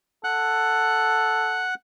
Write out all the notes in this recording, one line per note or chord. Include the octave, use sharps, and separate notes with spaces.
A4 F#5 F#6